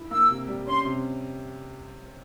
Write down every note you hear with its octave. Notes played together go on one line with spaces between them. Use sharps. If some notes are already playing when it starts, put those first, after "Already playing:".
Already playing: E4
A#3 E6
C3
G3
C#4 C6
C3